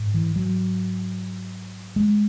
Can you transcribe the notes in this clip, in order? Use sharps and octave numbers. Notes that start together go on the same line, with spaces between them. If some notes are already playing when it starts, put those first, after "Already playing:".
Already playing: G#2
E3
F#3
G#3